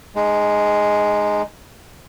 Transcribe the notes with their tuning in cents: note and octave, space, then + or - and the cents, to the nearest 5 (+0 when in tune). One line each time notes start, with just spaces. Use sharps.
G#3 +5 D#4 -30